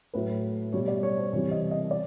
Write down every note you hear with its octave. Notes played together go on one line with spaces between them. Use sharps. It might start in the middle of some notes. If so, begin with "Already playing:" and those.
A2 F#3 B4
B2 G3 C#5
D5
C#5
C5
C3 E3 G3 C#5
D#5
D#5
D5